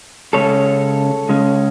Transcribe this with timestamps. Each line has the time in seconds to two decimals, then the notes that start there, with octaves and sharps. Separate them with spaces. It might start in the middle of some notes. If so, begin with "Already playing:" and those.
0.33 C#3 G#3 C#4 A4 C#5
1.29 C#3 G#3 C#4